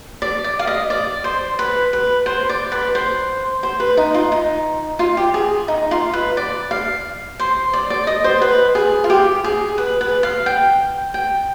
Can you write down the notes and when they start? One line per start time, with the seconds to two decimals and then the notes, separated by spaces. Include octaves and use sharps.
0.22 D5
0.44 D5
0.59 F5
0.67 D#5
0.90 D5
1.24 C5
1.59 B4
1.93 B4
2.26 C5
2.49 D5
2.72 B4
2.95 C5
3.63 C5
3.80 B4
3.97 D#4
4.14 F4
4.32 D#4
4.99 F4
5.17 G4
5.34 G#4
5.68 D#4
5.91 F4
6.13 B4
6.37 D5
6.71 F5
7.40 C5
7.73 D5
7.90 D5
8.07 D#5
8.24 C5
8.41 B4
8.75 G#4
9.04 F4
9.10 G4
9.44 G#4
9.78 B4
10.01 B4
10.23 F5
10.46 G5
11.14 G5